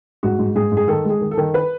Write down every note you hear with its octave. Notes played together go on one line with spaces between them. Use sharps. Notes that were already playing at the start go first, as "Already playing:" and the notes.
G#2 F#4
G#2
G#2 G#4
G#2
G#4
D#3 A4
G#3 G#4
D#3
A4
D#3
B4